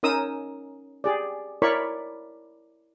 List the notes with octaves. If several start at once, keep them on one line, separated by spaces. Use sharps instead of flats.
C#4 D#4 A#4 D#6 E6
G4 G#4 D5
E4 A#4 C#5 D5 B5 C#6